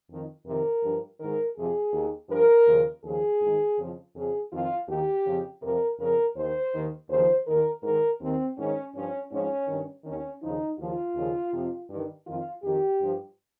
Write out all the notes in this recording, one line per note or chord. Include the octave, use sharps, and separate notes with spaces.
F2 D#3
F2 C3 D#3 A#4
G2 F3
G#2 D#3 A#4
F2 C3 F3 G#4
D#2 D#3
G2 F3 A#4
D#2 C#3 F3
D#2 C#3 F3 G#4
G#2 D#3
F2 C#3 F3
F2 C#3 F3 G#4
F2 D#3 F4
D#2 D#3 G4
F2 C#3 F3
F2 C3 F3 A#4
F2 C#3 F3 A#4
D#2 D#3 C5
D#2 D#3
D#2 C#3 F3 C5
D#2 D#3 A#4
G#2 D#3 A#4
D#2 D#3 C4
G#2 D#3 C#4
G2 F3 C#4
G#2 F3 C#4
G2 D#3
D#2 D#3 C#4
D#2 C#3 F3 D#4
D#2 C#3 F3 F4
D#2 C#3 F3
F2 C3 F3
G2 D#3
F2 D#3 F4
F2 D#3 G4
G2 F3